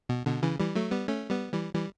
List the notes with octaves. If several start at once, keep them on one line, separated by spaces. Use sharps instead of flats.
B2
B2 D3
C#3 E3
E3 G3
F#3 A3
G3 B3
A3 C#4
G3 B3
E3 G3
E3 G3